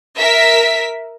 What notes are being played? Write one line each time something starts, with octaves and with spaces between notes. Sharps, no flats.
A#4 E5 B6